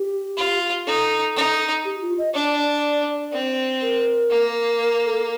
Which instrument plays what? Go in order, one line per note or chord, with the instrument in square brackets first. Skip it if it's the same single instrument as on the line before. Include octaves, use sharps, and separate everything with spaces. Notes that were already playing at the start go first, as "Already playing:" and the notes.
Already playing: [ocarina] G4
[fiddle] F4
[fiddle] D#4 [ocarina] A4
[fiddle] D#4
[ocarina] G4
F4
D#5
[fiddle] D4 [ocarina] D5
[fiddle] C4
[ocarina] A#4
[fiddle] A#3
[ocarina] A#4
A4